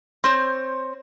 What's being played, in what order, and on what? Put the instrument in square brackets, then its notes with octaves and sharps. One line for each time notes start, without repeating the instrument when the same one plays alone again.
[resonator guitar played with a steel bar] C4 C5 C#5